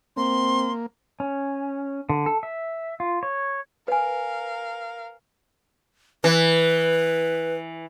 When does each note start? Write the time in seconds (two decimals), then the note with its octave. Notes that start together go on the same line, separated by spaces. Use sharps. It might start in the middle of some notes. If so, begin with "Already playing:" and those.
0.17 A#3 C4 C6
1.20 C#4
2.09 D3
2.26 A4
2.43 E5
3.00 F4
3.23 C#5
3.88 A#4 B4 F5 G#5
6.24 E3 B4